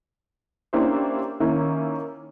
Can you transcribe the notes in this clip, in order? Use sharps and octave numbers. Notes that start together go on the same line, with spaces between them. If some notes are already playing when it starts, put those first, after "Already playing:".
A#3 C#4 D4 E4 G4 C5
D#3 A#3 C#4 E4